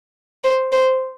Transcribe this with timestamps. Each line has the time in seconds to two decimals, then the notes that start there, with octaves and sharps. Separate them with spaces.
0.44 C5
0.72 C5